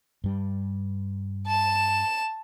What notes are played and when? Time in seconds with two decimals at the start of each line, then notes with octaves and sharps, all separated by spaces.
0.24 G2 G3
1.47 A5 E7